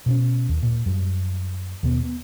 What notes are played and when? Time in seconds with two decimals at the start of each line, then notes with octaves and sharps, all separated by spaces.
0.06 B2 C4 C#4
0.49 D#2
0.63 A#2
0.86 F#2 G3
1.83 D#2 B2 B3
2.03 B3